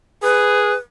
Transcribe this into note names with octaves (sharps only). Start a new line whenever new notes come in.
G#4 B4